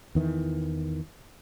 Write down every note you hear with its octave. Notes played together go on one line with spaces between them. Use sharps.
E2 D#3 E3